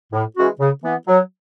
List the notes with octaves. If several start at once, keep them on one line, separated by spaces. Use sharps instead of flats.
A2
E3 G#3 C#4 F#4
C#3
E3 B3
F#3